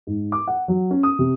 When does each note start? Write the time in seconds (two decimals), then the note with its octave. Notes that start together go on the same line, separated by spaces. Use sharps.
0.07 G#2
0.32 D6
0.47 F#5
0.68 F#3
0.91 C#4
1.03 D#6
1.19 C3